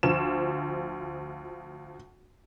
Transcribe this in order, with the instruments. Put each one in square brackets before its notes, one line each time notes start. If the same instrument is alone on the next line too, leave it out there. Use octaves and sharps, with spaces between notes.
[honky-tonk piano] D2 F3 E7